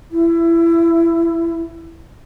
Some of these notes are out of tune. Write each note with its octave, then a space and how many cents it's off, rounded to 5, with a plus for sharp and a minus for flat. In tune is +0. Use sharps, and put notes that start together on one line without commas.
E4 +20